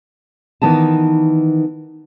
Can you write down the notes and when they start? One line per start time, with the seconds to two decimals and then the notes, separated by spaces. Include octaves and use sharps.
0.62 D#3 E3 B3 D#4 A5